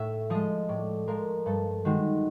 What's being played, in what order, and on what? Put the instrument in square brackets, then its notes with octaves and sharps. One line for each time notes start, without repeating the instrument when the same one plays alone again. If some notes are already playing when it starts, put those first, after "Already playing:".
Already playing: [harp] A2 E5
F3 G#3 D#5
A2 D5
F3 G#3 A#4
G2 A4
D#3 G#3 F#4